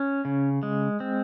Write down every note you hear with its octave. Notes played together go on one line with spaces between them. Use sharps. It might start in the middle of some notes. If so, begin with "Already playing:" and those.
Already playing: C#4
C#3
G#3
C4